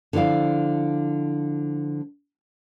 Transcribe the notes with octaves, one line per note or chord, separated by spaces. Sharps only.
D3 F3 E4 D5 F5